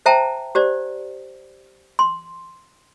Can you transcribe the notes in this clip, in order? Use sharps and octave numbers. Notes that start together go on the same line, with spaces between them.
C5 E5 G5 A5 A#5
G4 C5 D5
C6